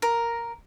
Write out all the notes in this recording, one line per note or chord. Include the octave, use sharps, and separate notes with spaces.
A#4